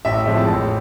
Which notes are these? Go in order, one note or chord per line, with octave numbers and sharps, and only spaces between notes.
A1 E5
A2 F3 G#3 C4 E5
A5
A1